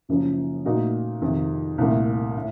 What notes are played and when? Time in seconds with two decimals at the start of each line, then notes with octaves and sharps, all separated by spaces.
0.09 F#1 F#2 F3
0.65 A#2 A3 D#4 F#4
1.22 F2 C3 D#3
1.78 C2 A#2 A3
2.36 A2